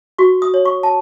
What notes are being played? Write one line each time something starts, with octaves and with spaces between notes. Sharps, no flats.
F#4 C#6
D#6
C#5
C#6
A5